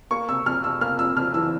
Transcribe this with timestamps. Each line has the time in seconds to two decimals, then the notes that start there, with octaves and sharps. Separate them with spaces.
0.11 A#3 C#6
0.29 C3 E6
0.46 F2 F6
0.63 C3 E6
0.81 A#3 F6
0.99 F2 E6
1.17 F2 F6
1.34 E3 E6